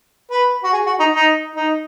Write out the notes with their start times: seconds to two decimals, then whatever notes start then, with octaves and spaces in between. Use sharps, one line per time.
0.31 B4
0.64 F#4
0.73 G#4
0.86 F#4
1.00 D#4
1.14 D#4
1.55 D#4